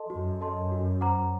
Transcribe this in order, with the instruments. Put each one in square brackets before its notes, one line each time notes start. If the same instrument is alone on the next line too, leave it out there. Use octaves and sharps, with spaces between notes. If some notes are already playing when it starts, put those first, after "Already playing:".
Already playing: [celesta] A4 D#5 A5 C6
[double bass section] F#2 [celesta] F#4
[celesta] A4 D#5 A5 C6
F#4
C5 F#5 A#5 D6